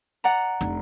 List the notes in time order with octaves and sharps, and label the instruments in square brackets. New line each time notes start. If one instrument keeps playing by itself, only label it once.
[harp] D5 F#5 A#5
[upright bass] F1 D4